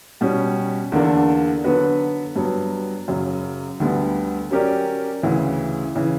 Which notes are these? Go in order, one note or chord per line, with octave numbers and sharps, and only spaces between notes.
B2 G3 C#4
E2 D3 A#3 D4
D3 F#3 B3 F#4 B4
G2 F#3 B3
F#2 C#3 F#3
D2 D3 G3 B3
F#3 C#4 G4 A#4 D5
D2 C#3 E3
C#3 E3